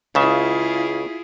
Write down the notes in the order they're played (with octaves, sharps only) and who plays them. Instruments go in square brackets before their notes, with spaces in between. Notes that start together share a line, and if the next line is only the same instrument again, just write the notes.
[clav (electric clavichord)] C#2 C#3 E5 [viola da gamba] E4 F4 G#4